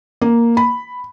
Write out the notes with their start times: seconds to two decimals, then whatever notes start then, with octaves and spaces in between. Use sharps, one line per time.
0.21 A#3
0.57 B5